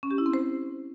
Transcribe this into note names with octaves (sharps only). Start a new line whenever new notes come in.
C#4
G4
E4
C4
C5